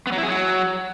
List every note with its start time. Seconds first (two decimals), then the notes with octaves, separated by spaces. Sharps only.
0.07 B3
0.12 F#3
0.18 E4
0.23 G#4
0.28 F#3